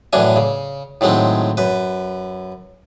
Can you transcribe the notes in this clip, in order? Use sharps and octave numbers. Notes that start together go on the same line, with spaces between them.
F#2 A2 E3 D4 G#5
C#3
A2 D#3 F#3 G#3 C4
F#2 B4